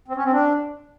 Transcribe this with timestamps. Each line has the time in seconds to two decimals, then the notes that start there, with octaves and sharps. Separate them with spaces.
0.08 C4
0.16 C#4
0.24 C4
0.32 D4